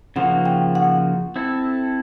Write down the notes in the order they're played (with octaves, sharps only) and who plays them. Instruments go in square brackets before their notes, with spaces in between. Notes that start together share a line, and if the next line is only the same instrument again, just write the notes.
[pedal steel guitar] C#3 F3 A#3 D#4 F#4 [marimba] F#5
[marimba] G5
F#5
[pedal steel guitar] C4 E4 A4